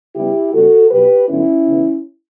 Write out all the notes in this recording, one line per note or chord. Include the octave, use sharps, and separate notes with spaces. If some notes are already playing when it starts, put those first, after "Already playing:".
C#3 G3 B3 E4 G4
C#3 G3 B3 F#4 A4
B2 F#3 B3 G4 B4
G2 D3 F#3 B3 C#4 E4
C#3 E3 B3